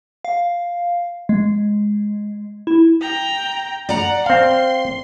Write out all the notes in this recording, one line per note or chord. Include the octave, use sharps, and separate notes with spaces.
F5
G#3
E4
G5 A#5
D5 F#5 A#5
C4 F5 C6